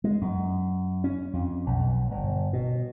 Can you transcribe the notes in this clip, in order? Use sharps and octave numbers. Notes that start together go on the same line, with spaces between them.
G#3
F#2
C#4
F2
B1
G1
B2